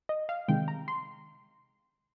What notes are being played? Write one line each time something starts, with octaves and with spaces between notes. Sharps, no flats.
D#5
F5
C3 D#3 G#3 G5
A#5
C6